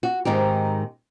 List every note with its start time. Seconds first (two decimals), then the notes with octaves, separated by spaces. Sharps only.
0.03 F#4
0.25 G#2 D#3 C4 D#4 G4